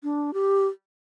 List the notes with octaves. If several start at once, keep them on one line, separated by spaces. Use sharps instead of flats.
D4
G4